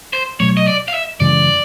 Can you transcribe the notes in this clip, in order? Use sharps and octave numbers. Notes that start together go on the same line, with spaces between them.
C5
B2 F#3 A3 C#5
D#5
D5
F5
E5
F#2 C#3 E3 G#3 D5